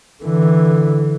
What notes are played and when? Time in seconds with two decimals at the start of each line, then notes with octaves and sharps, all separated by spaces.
0.23 D3 E3